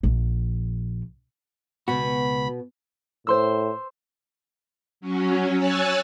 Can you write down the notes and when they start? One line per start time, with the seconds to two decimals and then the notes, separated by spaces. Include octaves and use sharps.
0.03 A#1
1.88 C#2 B2 B3 F#4 B5
3.27 A2 C5 C6 E6
5.01 F#3 C#4
5.55 C#5 G#5 E6 F#6 A6